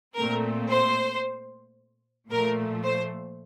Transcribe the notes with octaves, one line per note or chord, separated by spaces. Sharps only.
A#2 A3 C4 A#4
C5
A#2 F3 A3 A#4
C5